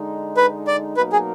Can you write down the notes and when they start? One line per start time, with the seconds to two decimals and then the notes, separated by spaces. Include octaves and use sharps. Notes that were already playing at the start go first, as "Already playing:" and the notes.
Already playing: D3 G#3 D#4
0.37 B4
0.67 D5
0.97 B2 F#3 A#3 D#4 A#4 B4
1.12 G#4